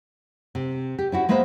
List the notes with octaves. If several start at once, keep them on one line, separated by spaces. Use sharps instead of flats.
C3
G4
C#4 E4 F#4
G#3 A#3 B3 B4 C5 E5